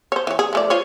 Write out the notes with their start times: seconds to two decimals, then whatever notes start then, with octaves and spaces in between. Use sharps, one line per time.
0.12 C5 C#5
0.27 E3 C#5
0.39 G#4
0.53 F3 A3 D5
0.70 F4 C5 C#5